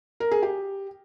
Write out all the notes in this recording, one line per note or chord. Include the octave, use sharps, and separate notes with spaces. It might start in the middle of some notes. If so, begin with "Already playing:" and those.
A#4
G#4
G4